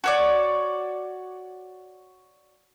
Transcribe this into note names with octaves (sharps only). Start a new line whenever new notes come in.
F#4 C#5 D5